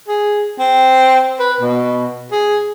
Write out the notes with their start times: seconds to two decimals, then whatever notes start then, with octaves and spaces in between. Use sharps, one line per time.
0.08 G#4
0.59 C4
1.39 B4
1.60 B2
2.31 G#4